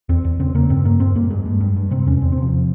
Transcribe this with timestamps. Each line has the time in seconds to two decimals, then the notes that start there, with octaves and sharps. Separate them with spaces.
0.09 E2 C4
0.25 E2
0.40 C#3 C4
0.55 C#3 A#3
0.70 G2 C4
0.85 G2 A#3
1.00 G2 C4
1.15 G2 A#3
1.30 G2 G#3
1.46 G2
1.61 G2
1.76 G2
1.91 C3 C4
2.06 E2 C#4
2.21 E2 C4
2.32 C4
2.37 C3 F3